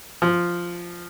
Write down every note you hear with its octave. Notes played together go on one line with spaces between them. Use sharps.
F3